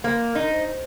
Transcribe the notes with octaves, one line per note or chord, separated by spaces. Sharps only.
A#3 A#4 C5
D#4
C5